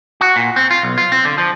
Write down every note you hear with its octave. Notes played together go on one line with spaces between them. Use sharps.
F#4
A#2
C4
F4
B1
F4
C4
D3
F3